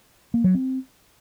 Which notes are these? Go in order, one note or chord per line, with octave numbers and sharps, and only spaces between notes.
A#3
F#3
C4